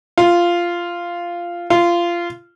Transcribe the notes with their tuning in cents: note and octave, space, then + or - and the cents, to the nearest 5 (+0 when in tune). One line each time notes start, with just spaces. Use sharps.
F4 -10
F4 -20